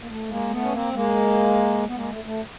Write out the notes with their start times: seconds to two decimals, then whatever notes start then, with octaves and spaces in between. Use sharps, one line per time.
0.01 A#3
0.08 A3
0.29 G#3 A#3
0.50 A3 B3
0.62 C#4
0.72 A#3 C4
0.94 G#3 A#3
1.87 B3
1.95 G#3 A#3
2.10 A3
2.25 A3